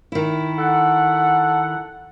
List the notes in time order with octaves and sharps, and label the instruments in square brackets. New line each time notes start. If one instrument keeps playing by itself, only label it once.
[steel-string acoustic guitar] D#3 E4
[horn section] A4 F#5